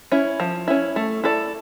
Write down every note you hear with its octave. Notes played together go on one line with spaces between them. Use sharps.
C#4 E4
F3
C#4 E4
A3
E4 A4 D5